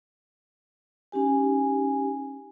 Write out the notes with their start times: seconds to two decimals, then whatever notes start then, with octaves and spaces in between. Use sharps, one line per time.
1.12 C#4 D#4 G4 G#5